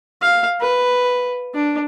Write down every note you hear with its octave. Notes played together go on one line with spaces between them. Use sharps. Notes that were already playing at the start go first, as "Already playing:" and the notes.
F5
B4
D4